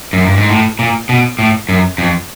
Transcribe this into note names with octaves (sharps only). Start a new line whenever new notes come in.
F#2
G2
G#2
A2
A#2
B2
A2
F#2
F2